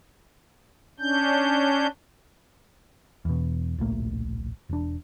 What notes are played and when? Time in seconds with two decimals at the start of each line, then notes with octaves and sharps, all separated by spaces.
1.00 C#4 D4 G6
3.25 E2 B2
3.78 D1 A#1 A3 A#3
4.69 E1 D4